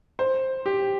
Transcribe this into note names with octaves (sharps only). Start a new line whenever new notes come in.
C5
G4